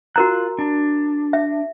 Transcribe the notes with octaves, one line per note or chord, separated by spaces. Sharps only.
F4 F#4 A#4 A#5 F#6
D4
E5